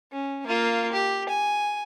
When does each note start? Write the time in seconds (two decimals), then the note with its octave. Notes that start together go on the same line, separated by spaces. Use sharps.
0.12 C#4
0.47 A#3 F4
0.92 G4
1.29 G#5